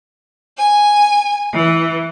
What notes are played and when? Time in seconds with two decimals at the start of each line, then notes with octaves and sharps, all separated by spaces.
0.57 G#5
1.54 E3